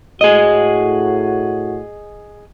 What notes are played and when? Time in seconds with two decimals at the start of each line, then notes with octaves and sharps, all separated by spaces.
0.21 A2 F#4 G#4 D#5